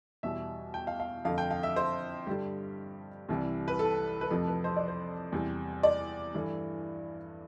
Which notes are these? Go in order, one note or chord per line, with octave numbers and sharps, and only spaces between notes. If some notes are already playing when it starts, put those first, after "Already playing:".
E2 B2 G3 E5
G5
F5
F5
F2 D3 A3 F5
G5
F5
E5
C5
G2 D3 G3 G4
C2 C3 E3 G3
B4
A4
B4
F2 C3 F3 A3 A4
B4
C5
D5
C5
E2 C3 G3
D5
G2 E3 A3